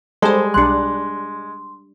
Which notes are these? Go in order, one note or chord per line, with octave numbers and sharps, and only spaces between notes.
G3 G#3 A4 C5
B1 G3 D4 C6 F#6